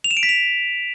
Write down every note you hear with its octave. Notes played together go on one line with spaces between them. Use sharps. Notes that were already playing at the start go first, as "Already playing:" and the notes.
F7
E7
D7
B6
F7